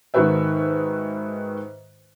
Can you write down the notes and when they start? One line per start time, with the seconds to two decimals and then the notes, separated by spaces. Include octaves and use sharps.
0.14 G#2 D#3 F#4 B4 E5